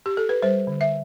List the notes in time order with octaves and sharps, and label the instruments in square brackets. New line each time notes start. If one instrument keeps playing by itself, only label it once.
[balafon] G4
A4
B4
G3 C5
D3
E5